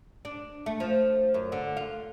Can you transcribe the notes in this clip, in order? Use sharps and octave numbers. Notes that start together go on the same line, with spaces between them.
D4
A3
F3
F#2
D3
F4